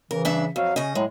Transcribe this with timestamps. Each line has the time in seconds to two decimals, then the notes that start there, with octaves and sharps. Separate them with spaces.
0.11 C#3 E3 A#4
0.25 G2 D4 E5
0.56 F2 F#3 F#4 F5
0.76 C#3 C#4 D#5
0.95 A2 F#3 G#3